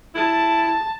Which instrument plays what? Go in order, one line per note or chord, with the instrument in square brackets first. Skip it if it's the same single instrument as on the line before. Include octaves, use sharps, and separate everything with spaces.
[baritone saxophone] E4 [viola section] A5